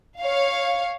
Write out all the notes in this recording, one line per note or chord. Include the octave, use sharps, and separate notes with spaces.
C#5 F5